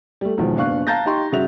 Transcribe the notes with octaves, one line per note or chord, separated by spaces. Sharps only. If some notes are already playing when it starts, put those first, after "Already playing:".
G3 A3
B1 E2 G#2 B2 D#3 F3
F#1 B3 D4 F5 C#6 F#6
F5 A5 A#5 G6 A6 A#6
D#4 G4 A#5 C6 C#6
G2 C#3 F#4 E5 F7